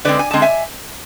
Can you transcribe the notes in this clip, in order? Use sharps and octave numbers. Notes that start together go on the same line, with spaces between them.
D3 G#3 C4 B4 D5
G#5
D3 G#3 C4 A5
E5 G#5